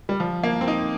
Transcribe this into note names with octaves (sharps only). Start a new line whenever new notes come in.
G3
F3
A#3
C4
D#4